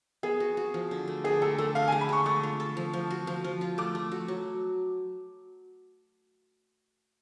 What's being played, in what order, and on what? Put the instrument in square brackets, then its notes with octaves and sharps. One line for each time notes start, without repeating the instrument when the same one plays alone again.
[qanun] B3 [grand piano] G#4
[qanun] F#4
F#4
F3
D3
A3
[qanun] D3 [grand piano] G#4
[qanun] A3 [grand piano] A4
[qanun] A3 [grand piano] A4
[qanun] D3 [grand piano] F5
[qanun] G#3 [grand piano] G#5
[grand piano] B5
[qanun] D3 [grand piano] C#6
[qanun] A3 [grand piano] C#6
[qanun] F4
A4
F3
F3
F#4
F3
F3
F4
[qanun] A3 [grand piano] D6
[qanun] A3
F#4
F#3